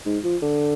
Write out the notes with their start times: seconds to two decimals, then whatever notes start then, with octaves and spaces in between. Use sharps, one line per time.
0.06 G#2
0.24 F3
0.42 D3